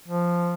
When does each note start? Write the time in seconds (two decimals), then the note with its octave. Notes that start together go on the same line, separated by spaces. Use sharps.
0.08 F3